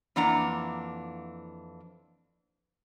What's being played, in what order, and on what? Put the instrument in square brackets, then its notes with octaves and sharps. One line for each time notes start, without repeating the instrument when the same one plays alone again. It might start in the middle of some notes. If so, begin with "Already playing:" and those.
[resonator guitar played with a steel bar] F2 E3 A#3 D4 F#5 A#5